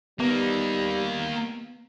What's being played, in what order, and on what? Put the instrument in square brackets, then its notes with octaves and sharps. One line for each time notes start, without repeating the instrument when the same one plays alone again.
[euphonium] G3 [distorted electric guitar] A#3 D#4 [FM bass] B3